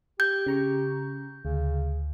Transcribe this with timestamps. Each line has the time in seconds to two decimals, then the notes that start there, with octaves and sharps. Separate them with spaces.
0.20 G4 G6 G#6
0.47 C#3 A#5 C#6
1.45 D2 C#3